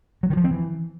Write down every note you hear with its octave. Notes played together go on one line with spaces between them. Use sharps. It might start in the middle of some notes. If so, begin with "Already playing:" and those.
F#3
D#3
F3
C4
E3